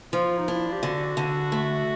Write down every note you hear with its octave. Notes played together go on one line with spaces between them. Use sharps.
F3 F4
D#4
D4 E4
G4
D3 F#4
D3
A3